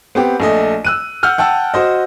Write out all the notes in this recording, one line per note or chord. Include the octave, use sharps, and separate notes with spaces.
B3 C4 G4
A#1 A3 D#5
E6 F#6 D#7
F#5 E6 F6 G6
F#5 G5 A5 E6
F#4 C5 D#5